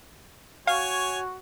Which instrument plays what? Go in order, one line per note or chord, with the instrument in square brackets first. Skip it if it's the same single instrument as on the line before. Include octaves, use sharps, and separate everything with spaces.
[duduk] F#4 [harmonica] C#5 G#5 [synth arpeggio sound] F5